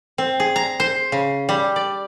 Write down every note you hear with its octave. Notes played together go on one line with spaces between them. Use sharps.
C4
G#4
A#5
C5
C#3
G3
D5